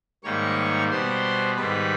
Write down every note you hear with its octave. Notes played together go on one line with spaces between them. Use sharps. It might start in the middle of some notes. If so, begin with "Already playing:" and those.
G#2 D#3 G3 A#3 C#5 C#6
B2 G3 B3 C5 C6
G#2 D#3 G3 B4 B5